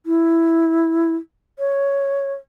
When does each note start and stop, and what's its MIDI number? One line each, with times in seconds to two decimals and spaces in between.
0.06 1.15 64
1.59 2.33 73